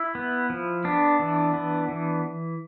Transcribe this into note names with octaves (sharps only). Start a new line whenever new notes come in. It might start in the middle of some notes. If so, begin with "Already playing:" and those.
Already playing: E4
B3
F3
B3 D4
E3
B3
E3